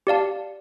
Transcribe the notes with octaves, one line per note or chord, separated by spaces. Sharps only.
G4 D5 F5 A5